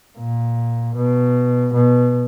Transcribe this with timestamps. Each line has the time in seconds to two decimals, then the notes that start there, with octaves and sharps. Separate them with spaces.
0.18 A#2
0.96 B2
1.74 B2